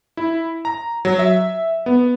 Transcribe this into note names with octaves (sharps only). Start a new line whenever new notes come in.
E4
A#5
F#3
E5
B3